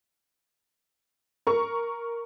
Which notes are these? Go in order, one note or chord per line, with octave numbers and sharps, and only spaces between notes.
A#4 C#6